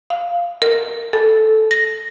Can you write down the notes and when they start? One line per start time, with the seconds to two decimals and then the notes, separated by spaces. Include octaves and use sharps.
0.10 F5
0.62 A#4
1.13 A4
1.71 A#6